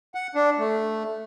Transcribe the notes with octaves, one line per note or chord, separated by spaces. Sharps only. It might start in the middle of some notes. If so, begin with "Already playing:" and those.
F#5
D4
A3